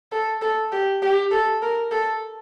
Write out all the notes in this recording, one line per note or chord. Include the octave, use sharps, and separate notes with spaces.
A4
A4
G4
G4
A4
A#4
A4